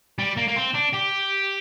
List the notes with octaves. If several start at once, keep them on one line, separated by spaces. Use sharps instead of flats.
G3
A#3
A#3
C4
D4
G4